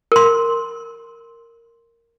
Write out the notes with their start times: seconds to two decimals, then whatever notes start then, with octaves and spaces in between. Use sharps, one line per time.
0.12 A#4 C6